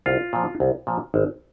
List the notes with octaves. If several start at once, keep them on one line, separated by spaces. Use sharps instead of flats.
C2 F4
A#2 F3
C2
A#2 F3
G#1